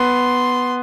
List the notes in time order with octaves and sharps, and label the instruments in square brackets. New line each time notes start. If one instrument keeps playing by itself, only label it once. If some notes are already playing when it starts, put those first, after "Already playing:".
Already playing: [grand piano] B3 [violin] C6